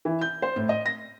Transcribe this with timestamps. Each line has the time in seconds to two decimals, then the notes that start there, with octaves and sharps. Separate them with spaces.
0.05 E3
0.21 G6
0.42 C5
0.56 A2
0.69 D#5
0.86 A#6